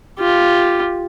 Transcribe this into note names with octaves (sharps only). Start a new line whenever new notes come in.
F4 G4